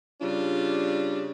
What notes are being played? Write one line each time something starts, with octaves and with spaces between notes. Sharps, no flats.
C#3 G3 D4 F4